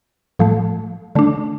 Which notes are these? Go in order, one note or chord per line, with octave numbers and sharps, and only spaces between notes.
A2 F3 A3
D3 A3 D4